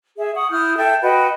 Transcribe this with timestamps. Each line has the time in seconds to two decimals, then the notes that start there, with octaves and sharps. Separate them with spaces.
0.18 G#4 E5
0.35 F#5 C#6 D#6
0.50 E4 D#6 F6 G6
0.77 A4 E5 G5 G6
1.02 F#4 B4 D#5 G5